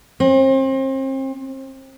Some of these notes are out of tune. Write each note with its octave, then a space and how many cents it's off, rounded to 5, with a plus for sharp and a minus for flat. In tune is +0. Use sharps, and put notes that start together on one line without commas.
C4 +35